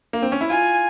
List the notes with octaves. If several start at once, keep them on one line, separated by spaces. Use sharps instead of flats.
A#3
C4
C#4
E4
F4 G#5